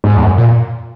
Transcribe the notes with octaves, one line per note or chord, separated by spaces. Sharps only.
G#2
E2
F#2
A#2